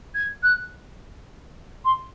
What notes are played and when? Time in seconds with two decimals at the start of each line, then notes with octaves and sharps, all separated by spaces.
0.15 G#6
0.43 F#6
1.85 C6